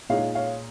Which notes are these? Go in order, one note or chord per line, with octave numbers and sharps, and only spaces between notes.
A#2 G#3 D#4 C#5 F5
C#5 F5